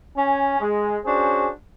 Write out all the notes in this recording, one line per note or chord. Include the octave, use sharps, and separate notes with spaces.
C#4 G#5
G#3
C#4 D4 F#4 G#4 C5